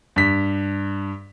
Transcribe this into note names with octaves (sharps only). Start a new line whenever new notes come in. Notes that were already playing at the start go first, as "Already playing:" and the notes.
G2 B6